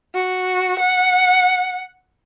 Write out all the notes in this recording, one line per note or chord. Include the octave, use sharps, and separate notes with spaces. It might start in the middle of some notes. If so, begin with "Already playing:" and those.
F#4
F#5